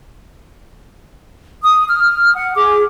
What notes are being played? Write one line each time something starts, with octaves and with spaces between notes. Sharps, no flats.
D#6
F6
F#5
G#4 D6